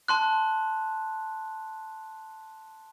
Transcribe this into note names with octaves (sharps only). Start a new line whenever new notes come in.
A5 C6 F#6